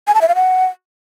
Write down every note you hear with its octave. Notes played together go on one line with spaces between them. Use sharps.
G#5
A5
E5
F5
F#5